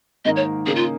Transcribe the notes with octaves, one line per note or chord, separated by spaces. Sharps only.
G#2 D#3 A#3 D#4 A#4 D#5
C#5
C#3 A#3 D#4 G#4 A#4
F4